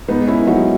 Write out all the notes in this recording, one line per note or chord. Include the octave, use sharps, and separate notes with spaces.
G#2 B3 D#4
A#3 C#4 E4
F#3 D#4 F#4